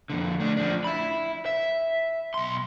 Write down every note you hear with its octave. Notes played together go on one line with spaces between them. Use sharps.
F2 D3
A3 D4
F3 D4
E5 B5
E5
B1 C6